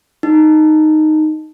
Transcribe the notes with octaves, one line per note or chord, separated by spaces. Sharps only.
D#4